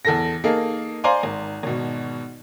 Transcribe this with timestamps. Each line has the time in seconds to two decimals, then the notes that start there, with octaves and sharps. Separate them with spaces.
0.05 E2 A4 A#6
0.44 A#3 D#4 G#4 A4
1.04 C5 D5 F5 G#5 A#5 C6
1.23 G#1
1.63 G#1 B2